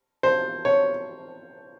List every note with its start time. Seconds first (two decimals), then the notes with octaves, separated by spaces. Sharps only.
0.23 C5
0.65 C#5